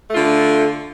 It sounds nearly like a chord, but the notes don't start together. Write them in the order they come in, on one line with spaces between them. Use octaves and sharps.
A3 F4 D3